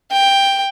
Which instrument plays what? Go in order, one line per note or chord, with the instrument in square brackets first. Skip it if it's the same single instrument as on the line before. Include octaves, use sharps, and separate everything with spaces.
[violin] G5